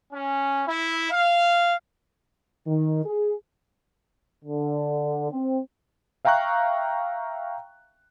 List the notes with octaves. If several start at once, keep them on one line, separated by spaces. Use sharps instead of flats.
C#4
E4
F5
D#3
G#4
D3
C4
E5 F5 G5 A#5 C#6 F#6